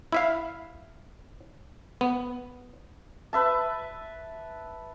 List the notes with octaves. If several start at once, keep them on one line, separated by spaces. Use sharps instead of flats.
E4 E5 F5
B3
B4 E5 A5